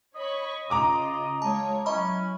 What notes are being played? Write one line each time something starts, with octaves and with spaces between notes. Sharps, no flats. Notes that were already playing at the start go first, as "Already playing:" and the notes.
C#5 D#5 B5 C#6
C#3 F4 A#5 D6 D#6
G#3 F4 C#5 A5
F#3 C#4 E4 D#5 B5